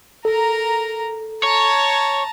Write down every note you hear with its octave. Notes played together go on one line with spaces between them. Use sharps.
A4 A#4 A#5
C#5 A5 A#5